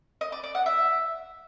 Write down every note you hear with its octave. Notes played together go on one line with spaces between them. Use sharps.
D#5
D5
D5
F#5
E5